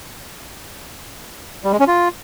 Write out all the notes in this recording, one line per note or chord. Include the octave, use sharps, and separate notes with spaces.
G3
G#3
C#4
F4